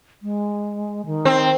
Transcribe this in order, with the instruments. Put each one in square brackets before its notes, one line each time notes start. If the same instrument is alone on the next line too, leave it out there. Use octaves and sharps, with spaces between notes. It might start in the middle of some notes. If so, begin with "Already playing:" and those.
[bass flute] G#3
D#3
[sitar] C4